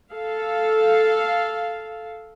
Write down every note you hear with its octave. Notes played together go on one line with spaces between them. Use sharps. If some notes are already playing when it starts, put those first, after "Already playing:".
A4 F5